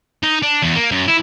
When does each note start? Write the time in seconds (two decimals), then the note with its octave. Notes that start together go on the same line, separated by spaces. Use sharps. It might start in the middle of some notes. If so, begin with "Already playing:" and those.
0.23 D#4
0.43 D4
0.63 E2
0.76 A#3
0.91 F#2
1.08 E4